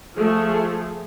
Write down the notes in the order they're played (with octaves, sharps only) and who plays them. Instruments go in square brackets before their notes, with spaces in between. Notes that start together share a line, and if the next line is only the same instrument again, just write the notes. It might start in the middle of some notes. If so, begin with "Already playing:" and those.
[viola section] F3 A3 G#4